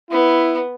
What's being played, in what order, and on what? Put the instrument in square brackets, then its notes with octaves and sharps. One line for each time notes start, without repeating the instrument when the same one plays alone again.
[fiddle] B3 [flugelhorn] E4